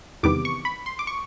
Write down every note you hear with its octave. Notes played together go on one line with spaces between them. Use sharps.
E2 C3 D#3 G3 B3 D6
C#6
B5
C6
D6
C#6